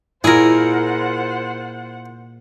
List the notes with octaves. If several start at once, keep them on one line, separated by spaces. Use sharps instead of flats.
A#2 E4 F4 G#4 A#4 C5 F#5